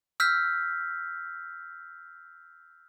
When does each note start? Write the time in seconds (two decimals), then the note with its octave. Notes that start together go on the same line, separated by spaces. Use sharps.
0.20 E6 F6 G6 B6